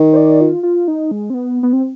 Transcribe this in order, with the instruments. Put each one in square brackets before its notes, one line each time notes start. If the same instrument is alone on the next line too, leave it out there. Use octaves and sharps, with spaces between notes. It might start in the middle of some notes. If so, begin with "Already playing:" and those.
Already playing: [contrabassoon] D#3
[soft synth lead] C5
D5
F4
F4
D#4
G#3
C4
B3
B3
C4